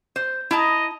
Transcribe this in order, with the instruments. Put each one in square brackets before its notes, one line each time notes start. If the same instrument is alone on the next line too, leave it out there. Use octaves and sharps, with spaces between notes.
[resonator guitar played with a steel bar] C5
[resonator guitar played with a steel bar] E4 A5 A#5 [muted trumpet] D#5